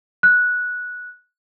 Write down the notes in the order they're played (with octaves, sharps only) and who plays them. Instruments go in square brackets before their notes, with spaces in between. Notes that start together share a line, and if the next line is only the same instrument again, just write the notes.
[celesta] F#6